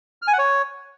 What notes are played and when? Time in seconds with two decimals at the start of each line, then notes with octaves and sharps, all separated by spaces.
0.22 F6
0.28 G#5
0.33 F#5
0.39 C#5